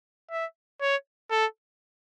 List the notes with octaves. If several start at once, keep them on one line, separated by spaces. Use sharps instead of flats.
E5
C#5
A4